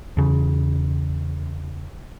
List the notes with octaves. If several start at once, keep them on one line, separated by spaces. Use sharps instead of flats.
E2 C#3